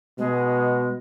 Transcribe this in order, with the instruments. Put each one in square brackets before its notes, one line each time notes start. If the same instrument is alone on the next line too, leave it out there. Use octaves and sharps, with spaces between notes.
[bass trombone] B2 [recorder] G#3